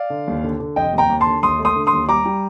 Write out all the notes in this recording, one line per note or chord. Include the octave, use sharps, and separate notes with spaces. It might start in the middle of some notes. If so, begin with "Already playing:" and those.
Already playing: D5 F5
D3
D#2
D3
D3
F1 D#5 G5
D#2
G5 A#5
D#2
A5 C6
D3
D#2 C6 D#6
A3
C6 D#6
D3
C6 D#6
D#2
G3 A#5 D6
G3